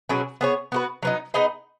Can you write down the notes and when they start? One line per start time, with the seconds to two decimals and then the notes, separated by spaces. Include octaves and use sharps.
0.09 B2 F#3 C#4 G#4
0.41 B3 G#4 C#5
0.72 B3 F#4 B4
1.02 F#3 B3 D#4
1.34 B3 D#4 G#4 D#5